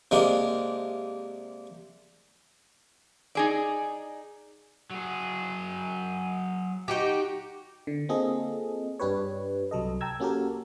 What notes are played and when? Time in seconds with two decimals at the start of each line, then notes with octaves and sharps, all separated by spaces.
0.11 C3 G#3 A#3 D4
3.35 D#4 G#4 D5
4.90 F#3 G#4
6.88 D#4 F#4 G4
7.87 D3
8.09 A#3 C4 F4 G#4 A4 D#5
8.99 G2 D4 G4 B4 C#5
9.71 C2 F#3 A4 D#5
10.01 G5 A5 A#5 E6 G#6
10.20 A#3 C#4 F#4 G4 A4 A#4